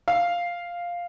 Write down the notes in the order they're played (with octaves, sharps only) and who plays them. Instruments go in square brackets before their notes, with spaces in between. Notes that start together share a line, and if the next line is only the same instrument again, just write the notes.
[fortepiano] F5